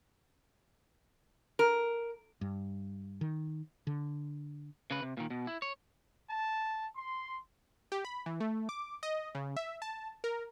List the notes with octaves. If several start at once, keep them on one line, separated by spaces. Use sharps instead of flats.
A#4
G2
D#3
D3
C#3 B4
C3
A#2 D#3
B2
E4
C#5
A5
C6
G4
B5
E3
A3
D6
D#5
C#3
E5
A5
A#4